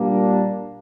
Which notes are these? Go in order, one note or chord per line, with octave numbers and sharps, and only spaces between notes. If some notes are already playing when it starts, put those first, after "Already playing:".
Already playing: A#2 G3 A#3 D4